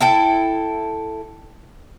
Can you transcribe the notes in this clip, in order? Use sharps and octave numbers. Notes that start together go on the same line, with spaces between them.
E4 A4 G5